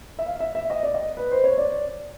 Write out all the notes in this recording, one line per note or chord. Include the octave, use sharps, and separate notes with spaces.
E5
F5
E5
E5
D#5
D5
D#5
B4
C5
C#5
D5